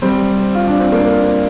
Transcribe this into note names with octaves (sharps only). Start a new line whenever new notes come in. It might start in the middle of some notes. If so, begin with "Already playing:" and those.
G3 C4
F4
D4
C4
A#3 D4